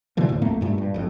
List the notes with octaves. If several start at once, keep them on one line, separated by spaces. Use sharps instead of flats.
B2 D3 E3 F3
D2 A2
E1 F2 A3 A#3
G2 A#2 G#3 A3
G2
G1 F2